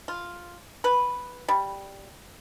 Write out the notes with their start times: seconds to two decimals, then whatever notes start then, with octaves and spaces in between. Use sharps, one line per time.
0.08 F4
0.84 B4
1.48 G3